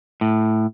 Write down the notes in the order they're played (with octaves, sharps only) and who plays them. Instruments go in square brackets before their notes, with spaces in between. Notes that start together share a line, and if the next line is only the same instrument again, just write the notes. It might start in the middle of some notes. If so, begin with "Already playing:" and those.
[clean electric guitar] A2